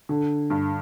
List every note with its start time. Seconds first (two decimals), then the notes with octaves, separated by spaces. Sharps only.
0.09 D3
0.50 G2